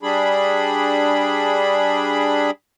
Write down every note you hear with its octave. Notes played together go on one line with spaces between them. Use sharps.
G3 D4 G#4 B5